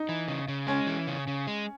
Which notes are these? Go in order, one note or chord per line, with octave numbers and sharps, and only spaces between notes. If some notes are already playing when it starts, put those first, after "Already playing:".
Already playing: D#4
E3
C#3
C#3
G#3 C#4
E3
C#3
C#3
G#3